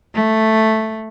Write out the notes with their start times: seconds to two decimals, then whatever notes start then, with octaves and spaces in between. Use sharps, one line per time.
0.14 A3